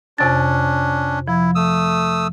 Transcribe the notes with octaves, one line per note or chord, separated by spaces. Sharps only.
F2 C3 C#4 D4 A6
F3 E4
A3 D#6 E6